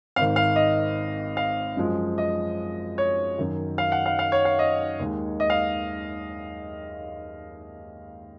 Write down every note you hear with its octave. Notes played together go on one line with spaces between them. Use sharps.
G#1 G#2 D#3 F5
F5
D#5
F5
F#2 F3 G#3
D#5
C#5
F#2 D#3 F#3
F5
F#5
F5
F5
C#5
F5
D#5
D#2 D#3 G#3
D#5
F5